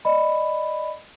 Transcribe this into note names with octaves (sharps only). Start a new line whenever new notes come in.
D5 D#5 B5